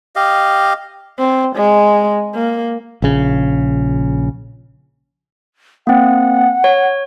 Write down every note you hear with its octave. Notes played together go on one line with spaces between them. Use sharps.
G4 D#5 F5
C4
G#3
A#3
A#1 C#3
A#3 C4 F#5
C#5